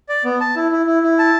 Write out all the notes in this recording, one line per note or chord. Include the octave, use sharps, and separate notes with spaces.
D5
B3
A5
E4
E4
E4
E4
A5